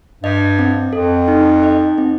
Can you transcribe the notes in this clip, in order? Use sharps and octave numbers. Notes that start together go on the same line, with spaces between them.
G2 D#5
C4
F2 A4
D#4
D#5
C4